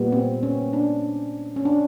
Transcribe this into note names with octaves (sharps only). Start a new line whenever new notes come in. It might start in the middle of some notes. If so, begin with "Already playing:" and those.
Already playing: A#2 G3 B3
C4
C#4
D4
C#4
D4